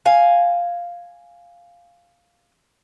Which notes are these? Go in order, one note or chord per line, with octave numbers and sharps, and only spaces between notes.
F5 G#5